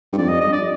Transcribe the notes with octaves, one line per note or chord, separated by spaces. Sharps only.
G2
F2 D5
D#5
G2 D#5
D5